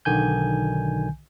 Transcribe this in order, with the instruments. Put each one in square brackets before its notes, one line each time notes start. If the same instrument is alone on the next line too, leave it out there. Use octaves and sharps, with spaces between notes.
[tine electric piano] B1 D3 D#3 G#5 G6